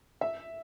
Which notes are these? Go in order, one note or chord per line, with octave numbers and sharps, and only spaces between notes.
E5